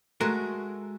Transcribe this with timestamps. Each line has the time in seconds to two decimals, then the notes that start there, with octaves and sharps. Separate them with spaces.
0.21 G#3 A3 F#4 A#4